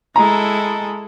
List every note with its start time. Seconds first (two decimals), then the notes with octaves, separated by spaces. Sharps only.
0.16 G#3 E4 A4 A#5